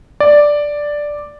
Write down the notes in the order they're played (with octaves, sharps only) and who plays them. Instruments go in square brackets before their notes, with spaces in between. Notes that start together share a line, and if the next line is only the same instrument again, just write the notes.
[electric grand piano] D5